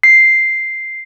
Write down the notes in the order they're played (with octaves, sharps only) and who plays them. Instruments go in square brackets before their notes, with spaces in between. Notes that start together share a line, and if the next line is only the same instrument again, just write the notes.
[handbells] C7